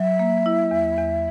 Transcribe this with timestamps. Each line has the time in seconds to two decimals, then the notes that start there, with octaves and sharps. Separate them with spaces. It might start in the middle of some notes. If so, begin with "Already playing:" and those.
Already playing: F#3 E5
0.19 A#3
0.46 E4
0.71 E2
0.97 E2